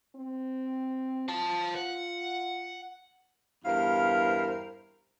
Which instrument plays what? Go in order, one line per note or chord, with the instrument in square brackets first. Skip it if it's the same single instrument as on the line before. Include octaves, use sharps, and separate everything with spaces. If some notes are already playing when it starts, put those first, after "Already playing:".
[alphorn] C4
[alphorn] F4 [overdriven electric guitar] C5 A5
[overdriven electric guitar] F#5
[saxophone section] E2 G2 E4 A#4 C5 F5